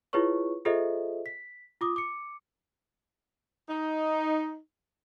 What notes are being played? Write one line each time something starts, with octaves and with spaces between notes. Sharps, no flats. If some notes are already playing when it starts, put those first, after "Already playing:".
E4 F4 G#4 B4 C#5 C#6
F4 G#4 A4 C5 D#5 E5
B6
F4 D6 D#6
D6 C#7
D#4